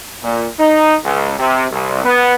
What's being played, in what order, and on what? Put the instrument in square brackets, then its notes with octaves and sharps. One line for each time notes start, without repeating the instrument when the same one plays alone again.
[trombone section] A#2
D#4
C#2
C3
C2
B3